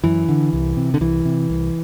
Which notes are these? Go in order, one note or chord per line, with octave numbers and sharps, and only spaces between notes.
F#2 E3
D3
C2
C3
D3
C2 E3
C3
C2